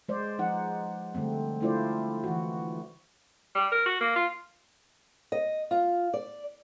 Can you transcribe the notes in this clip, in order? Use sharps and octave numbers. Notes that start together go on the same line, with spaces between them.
G#3 C5 D5
F3 D#4 F#5
D3 G3 A3 C4
A3 D4 E4 F4 C5 D5
E3 F#4
G3
A#4
F#4
A#3
F4
D#5
F4
D5